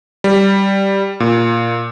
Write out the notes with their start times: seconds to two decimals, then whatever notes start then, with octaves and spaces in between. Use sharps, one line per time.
0.24 G3
1.20 A#2